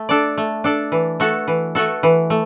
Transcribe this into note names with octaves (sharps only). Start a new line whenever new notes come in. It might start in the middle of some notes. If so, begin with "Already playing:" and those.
Already playing: A3
D4 A4 D5
A3
D4 A4 D5
E3
A3 F#4 A4
E3
A3 F#4 A4
E3
A3